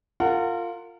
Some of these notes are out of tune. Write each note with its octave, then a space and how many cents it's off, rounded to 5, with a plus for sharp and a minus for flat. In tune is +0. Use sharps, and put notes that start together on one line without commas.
F4 +0 A#4 -35 F#5 +0